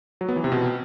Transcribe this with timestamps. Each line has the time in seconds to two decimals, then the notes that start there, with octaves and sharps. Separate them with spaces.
0.21 F#3
0.29 B3
0.36 E3
0.44 C3
0.52 B2